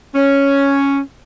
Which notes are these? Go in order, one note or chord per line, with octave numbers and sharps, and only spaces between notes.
C#4